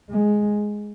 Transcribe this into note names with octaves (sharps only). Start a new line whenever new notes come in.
G#3